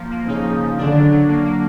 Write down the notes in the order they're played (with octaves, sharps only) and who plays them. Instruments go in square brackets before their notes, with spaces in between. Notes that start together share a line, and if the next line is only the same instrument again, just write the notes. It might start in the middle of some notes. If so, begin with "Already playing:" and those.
Already playing: [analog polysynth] F3 A#3
A#3
[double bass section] C#3 [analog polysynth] D#4
[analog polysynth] F3
F3
[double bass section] D3 [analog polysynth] D4
[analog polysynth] F#3
F#3
A#3
A#3